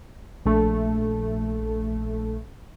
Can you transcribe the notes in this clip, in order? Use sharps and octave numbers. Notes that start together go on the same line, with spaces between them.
A#1 A3